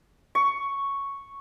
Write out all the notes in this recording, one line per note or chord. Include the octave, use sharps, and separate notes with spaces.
C#6